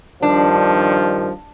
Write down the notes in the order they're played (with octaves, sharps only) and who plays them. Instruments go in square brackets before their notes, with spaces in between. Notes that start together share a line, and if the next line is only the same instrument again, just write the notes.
[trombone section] G2 D#3 F3 [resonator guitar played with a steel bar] D4